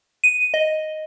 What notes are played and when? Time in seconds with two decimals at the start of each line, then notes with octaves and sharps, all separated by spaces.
0.24 D#7
0.54 D#5